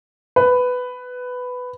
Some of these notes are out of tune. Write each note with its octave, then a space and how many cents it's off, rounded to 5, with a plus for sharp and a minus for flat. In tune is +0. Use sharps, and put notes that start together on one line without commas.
B4 +10